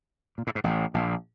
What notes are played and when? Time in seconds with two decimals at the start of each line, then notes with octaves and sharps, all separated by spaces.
0.38 A#2
0.47 A2
0.55 G#2
0.64 A1 A2
0.94 A#1 A#2